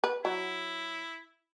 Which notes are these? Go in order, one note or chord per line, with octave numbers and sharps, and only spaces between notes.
B4
F#3 E4